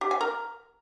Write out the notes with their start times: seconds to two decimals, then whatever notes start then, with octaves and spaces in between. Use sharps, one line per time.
0.01 G4
0.11 G#5
0.21 A#4